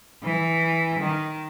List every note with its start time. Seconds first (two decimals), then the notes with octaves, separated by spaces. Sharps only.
0.23 E3
0.99 D#3